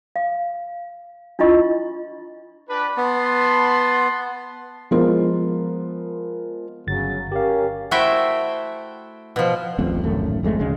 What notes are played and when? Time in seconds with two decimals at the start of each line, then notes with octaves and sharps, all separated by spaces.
0.16 F5
1.39 D4 E4 F4 D#5 C#6
2.69 D4 G4 B4
2.97 B3 A5 B5 C6
4.91 F3 G#3 B3 F4 A#4 C5
6.87 G1 C#3 F#3 A6
7.32 C#4 G4 A#4 F5
7.91 A3 E4 F#4 C5 E5 G5
9.36 B2 F3
9.78 D1 A1 F2
10.03 D1 G#1 F#2 A3
10.43 G#1 F2 G#3 A3
10.59 D2 C#3 G#3